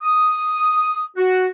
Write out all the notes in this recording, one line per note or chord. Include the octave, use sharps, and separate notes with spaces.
D#6
F#4